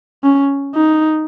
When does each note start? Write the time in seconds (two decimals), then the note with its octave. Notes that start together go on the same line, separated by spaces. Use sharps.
0.24 C#4
0.75 D#4